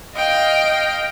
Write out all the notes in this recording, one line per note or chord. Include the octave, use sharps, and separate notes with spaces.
D#5 F5 G5